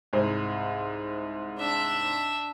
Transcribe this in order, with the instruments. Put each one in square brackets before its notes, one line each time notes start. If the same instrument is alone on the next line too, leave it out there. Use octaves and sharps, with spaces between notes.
[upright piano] C2 G#2 C5
[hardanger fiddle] D4 E5